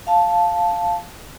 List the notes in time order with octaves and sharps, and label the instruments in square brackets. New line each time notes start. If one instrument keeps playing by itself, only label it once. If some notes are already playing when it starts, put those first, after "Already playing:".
[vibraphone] F5 A5